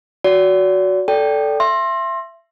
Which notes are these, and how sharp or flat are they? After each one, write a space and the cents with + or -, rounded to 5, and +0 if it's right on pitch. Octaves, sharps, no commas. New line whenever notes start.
F#4 +0 D5 -40
A4 +0 D5 -15 G5 +0
E5 +25 C6 +25